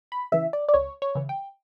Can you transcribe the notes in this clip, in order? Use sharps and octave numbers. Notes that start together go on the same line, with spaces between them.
B5
C#3 E3 E5
D5
D5
C#2 C#5
C#5
C#3 E3
G5